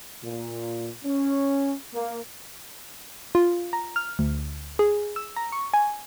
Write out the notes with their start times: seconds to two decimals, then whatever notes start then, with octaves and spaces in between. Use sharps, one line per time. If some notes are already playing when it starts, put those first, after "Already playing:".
0.23 A#2
1.04 C#4
1.93 A#3
3.35 F4
3.73 A#5
3.96 F6
4.19 D2
4.79 G#4
5.16 E6
5.36 A#5
5.52 C#6
5.74 G#5